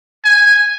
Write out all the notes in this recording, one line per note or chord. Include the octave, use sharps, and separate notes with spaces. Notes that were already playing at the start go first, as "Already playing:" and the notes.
G#5